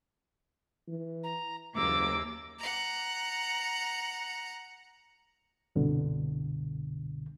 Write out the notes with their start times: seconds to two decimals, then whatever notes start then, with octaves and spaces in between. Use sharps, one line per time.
0.88 E3
1.24 A#5
1.77 F#1 D#2 E3 A#3 D6 E6
2.59 F#5 A#5
5.76 C2 G2 B2 D3